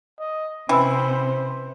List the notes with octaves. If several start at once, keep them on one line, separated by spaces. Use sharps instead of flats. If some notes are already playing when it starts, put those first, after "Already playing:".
D#5
C3 E3 C#4 C5 B5 E6